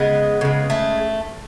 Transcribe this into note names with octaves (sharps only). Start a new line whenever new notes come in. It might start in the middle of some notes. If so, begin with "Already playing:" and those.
Already playing: C#3 G#3 B3
C#3 G#3
A3